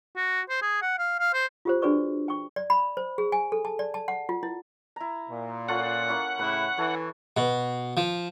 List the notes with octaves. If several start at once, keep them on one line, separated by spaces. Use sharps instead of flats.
F#4
C5
G#4
F#5
F5
F5
C5
F4 G4 C5
D4 F#4 G#4 B4 D5 C#6
G5 C#6
D5
B5
C5
G#4
G#5
A4
A5
D5
A5
F#5
F4
E4
E4 A#5
A#2
C#4 F4 A4 F#5
A#3 C#4 E4
A2 C#3 E4 B4
E3 A4 C#5
B2
F3